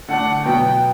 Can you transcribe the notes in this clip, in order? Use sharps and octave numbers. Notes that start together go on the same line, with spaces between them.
D3 A3 D4 F#5
B2 F#3 B3 G5